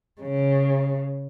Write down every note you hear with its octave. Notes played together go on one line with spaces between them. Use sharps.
C#3